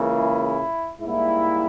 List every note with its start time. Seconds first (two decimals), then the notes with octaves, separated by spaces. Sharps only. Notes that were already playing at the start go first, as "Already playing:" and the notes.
Already playing: C#2 C#3 E3 A#3
0.12 E4
1.01 G#2 G3 A#3 E4